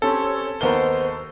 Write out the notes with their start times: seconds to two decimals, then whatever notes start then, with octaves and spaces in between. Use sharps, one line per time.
0.02 C4 C#4 G4 A4 C#5
0.61 D#2 A#3 B3 D#4 A#4 C5 G7